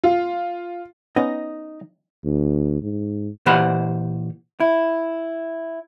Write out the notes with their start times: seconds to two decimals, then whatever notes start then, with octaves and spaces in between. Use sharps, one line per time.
0.04 F4
1.16 B3 C#4 D#4 D#5
2.25 D2
2.83 G#2
3.46 A#2 E3 G4 C5 F#5 B5
4.60 E4